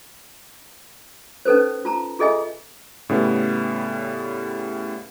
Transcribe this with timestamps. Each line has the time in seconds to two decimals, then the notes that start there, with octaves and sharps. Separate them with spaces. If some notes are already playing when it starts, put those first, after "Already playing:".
1.45 C#4 D#4 A4 B4 C5
1.85 F4 A5 A#5
2.19 F4 G#4 A4 D#5 E5 G#5
3.09 A2 C#3 G3 B3